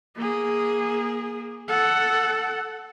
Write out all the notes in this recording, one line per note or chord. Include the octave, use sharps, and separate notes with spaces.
A#3 G#4
A4 F#5